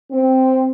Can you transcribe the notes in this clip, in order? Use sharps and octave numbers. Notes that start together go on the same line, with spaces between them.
C4